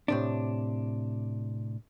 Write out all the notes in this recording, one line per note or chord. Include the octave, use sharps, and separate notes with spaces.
A2 C3 D4